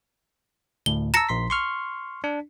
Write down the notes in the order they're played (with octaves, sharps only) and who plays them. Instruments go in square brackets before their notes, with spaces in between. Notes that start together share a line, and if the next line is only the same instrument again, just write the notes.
[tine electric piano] D2 A2 [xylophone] G7
[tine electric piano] A5 E6 [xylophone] A#5 A#6 C#7
[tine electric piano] A#1 C6 B6
C6 C#6 F6
D4